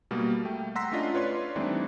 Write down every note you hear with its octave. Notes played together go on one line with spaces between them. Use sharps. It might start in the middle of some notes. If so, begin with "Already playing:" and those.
B2 G3 A#3
A3 G5
F#5 A#5 C6 E6 A#6 B6
A3 C#4 D4 F4 D#5
F4 B4 C#5 D5 C6
E3 G3 A3 C4 D4 D#4